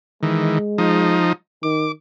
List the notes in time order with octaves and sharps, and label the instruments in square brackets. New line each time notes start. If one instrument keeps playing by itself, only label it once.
[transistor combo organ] D#3 E3 [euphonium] G#3
[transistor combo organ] F3 D#4
[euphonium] D#3 [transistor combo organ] D6